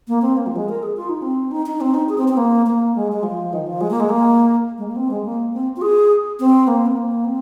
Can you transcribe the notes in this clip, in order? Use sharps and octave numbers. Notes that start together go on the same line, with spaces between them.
A#3
C4
A#3
F3
G#3
A#4
G#4
F4
D#4
C4
D#4
D#4
C4
D#4
G#4
C4
C4
A#3
A#3
G#3
G#3
F3
D#3
F3
G#3
A#3
G#3
A#3
G#3
A#3
C4
G#3
A#3
C4
F4
G#4
C4
A#3
C4
A#3
C4